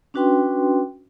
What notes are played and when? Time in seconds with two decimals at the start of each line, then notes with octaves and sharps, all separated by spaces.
0.14 C#4 D4 F#4 B4 G5 C6